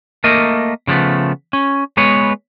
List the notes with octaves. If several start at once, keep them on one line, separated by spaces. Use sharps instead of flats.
A3 A#3 A#4 D#5
C#3 F3 F#3 A3 B3
C#4
G#3 B3 B4 C#5